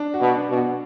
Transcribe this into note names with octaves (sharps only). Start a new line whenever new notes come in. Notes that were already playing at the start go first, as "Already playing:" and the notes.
Already playing: D4
F#4
B2
D4
B2
F#4